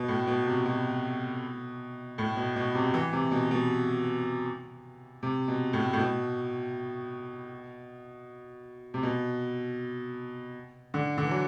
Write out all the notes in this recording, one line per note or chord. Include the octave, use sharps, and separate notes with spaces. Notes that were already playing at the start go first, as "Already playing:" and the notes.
Already playing: B2
A2
B2
C3
B2
A2
B2
B2
C3
E3
C3
B2
B2
C3
B2
A2
A2
B2
C3
B2
D3
D3
E3
F#3